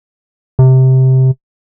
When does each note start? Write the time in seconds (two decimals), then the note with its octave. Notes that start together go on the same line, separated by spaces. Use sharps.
0.59 C3